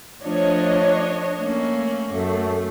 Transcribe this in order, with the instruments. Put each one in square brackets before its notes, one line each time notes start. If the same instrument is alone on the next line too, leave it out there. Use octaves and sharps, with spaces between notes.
[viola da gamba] F3 A3 [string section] D4 C#5 D#5
[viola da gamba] A3 A#3 C#4
[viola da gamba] F#2 [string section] A3